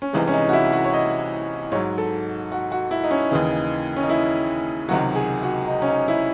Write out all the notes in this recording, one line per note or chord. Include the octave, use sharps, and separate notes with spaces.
C#4
C2 C3 E3 G#3 D#4
C#4
D#4
F#4
E4
F#4
C#5
D#5
G#2 F#3 C#5
A4
F#4
F#4
E4
D#4
C#4
D#2 C#3 E3 D#4
C#4
D#4
E4
C#2 C3 D#3 F#3 F#4
G#4
F#4
D#4
C#4
D#4
E4